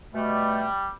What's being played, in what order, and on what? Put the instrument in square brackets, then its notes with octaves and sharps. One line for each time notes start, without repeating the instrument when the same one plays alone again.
[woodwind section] B2 A3 [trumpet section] G3